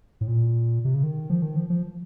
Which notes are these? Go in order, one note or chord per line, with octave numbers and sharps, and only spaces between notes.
A2
A#2
C3
C#3
D#3
F3
D#3
F3
F3